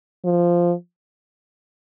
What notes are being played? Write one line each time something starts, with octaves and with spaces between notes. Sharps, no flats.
F3